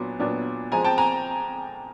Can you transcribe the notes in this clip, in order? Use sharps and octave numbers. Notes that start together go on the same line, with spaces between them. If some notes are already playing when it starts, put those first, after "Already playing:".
Already playing: A#2 F#3 B3 D4
A#2 F#3 B3 D4
F3 G#3 C4 G#5 A#5
G5 A5
G#5 A#5